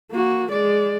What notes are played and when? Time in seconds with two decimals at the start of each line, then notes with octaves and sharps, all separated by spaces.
0.12 A#3 F#4
0.51 G#3 D5